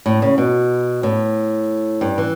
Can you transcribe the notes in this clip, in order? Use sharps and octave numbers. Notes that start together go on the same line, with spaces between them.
A2
C#3
B2
A2
G2
E3